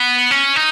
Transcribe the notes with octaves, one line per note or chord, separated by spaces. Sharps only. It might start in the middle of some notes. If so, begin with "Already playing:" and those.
Already playing: B3
C#4
D#4